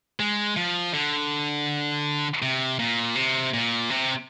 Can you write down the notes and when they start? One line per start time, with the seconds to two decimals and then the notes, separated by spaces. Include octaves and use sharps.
0.20 G#3
0.57 F3
0.94 D3
2.42 C3
2.79 A#2
3.15 C3
3.53 A#2
3.90 C3